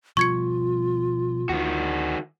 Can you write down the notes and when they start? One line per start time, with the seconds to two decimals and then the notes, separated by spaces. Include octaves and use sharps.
0.17 B2 F3 G3 F4 C#6 G#6 C#7
1.49 D2 D#3 F#4